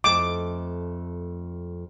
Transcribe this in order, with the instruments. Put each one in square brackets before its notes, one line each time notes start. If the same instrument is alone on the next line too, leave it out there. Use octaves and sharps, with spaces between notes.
[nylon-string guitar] F2 A3 D#5 [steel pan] D6